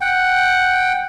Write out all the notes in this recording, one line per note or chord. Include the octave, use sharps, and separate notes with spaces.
F#5 G5